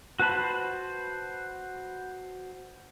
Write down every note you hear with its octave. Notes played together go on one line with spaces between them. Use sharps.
F#4 B4 C5 A5 B5